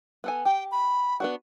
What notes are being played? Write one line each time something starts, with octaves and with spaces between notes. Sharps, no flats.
B3 A4 G#5
G4 G5
B5
B3 D4 F#4